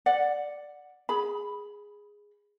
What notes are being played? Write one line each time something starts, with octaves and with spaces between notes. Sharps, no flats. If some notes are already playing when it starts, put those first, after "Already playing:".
D5 F#5
G#4 B5